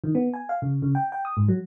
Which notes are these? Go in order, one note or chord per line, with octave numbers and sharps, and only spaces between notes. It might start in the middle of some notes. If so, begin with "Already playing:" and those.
D#3
B3
G#5
F5
C#3
C#3
G5
G5
D#6
G#2
F#3